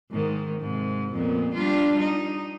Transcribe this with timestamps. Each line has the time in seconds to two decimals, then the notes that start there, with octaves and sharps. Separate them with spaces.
0.11 G#2 D#3
0.61 G#2 C3
1.13 F2 A#2 B3
1.54 G3 D4 F4
1.99 D#4